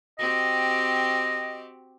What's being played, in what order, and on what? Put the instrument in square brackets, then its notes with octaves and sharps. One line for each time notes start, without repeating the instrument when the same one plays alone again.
[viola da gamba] C4 F#4 G4 [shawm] D#5